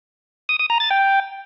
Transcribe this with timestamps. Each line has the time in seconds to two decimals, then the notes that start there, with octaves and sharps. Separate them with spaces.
0.49 D#6
0.59 D#6
0.70 A#5
0.80 A6
0.91 G5